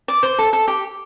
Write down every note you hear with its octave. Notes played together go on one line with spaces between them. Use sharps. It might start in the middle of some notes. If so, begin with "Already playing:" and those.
D5
C5
A4
A4
G4